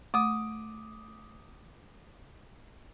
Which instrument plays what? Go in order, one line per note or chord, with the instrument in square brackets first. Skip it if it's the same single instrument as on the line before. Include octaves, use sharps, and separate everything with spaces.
[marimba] A3 [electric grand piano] D6 D#6